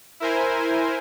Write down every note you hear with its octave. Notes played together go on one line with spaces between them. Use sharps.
E4 A#4 C5 G#5